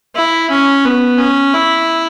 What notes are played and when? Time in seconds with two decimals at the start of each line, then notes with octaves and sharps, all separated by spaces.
0.15 E4
0.50 C#4
0.85 B3
1.18 C#4
1.53 E4